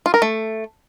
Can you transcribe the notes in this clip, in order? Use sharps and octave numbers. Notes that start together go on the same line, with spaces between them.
F4
A#4
A3